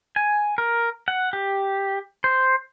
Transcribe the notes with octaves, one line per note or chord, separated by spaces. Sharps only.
G#5
A#4
F#5
G4
C5